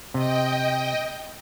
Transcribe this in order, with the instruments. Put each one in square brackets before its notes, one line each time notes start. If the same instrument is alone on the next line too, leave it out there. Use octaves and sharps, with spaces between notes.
[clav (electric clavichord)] C3 [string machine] D#5 G5